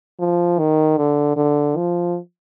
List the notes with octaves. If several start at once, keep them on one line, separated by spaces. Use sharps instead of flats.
F3
D#3
D3
D3
F3